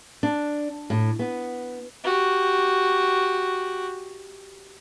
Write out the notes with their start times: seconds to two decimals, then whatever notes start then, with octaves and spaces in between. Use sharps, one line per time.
0.23 D4
0.90 A2
1.19 B3
2.04 F#4 G4